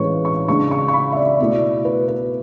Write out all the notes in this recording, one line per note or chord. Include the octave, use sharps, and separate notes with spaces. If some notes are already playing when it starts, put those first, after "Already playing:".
Already playing: A2 E3 G#3 C#4 B4 C#5 C#6
C#6
C#3 G#3 D4 C#6
C#6
C#6
B5
E5
D5
B2 A3 E4 D5
B4
B4